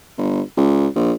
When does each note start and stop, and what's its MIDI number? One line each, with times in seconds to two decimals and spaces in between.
0.17 0.41 31
0.57 0.87 37
0.95 1.13 34